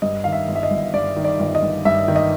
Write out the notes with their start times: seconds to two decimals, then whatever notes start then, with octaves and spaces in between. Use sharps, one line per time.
0.02 G2 D#5
0.24 D#3 F5
0.32 E5
0.48 G1
0.56 E5
0.63 D#5
0.71 G1
0.94 G2 D5
1.16 D#3
1.24 D5
1.39 G1
1.55 D#5
1.62 G1
1.85 G2 E5
2.08 D#3
2.16 D#5